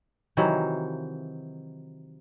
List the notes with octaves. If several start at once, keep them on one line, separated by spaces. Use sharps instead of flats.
C3 D#3 E3 F#3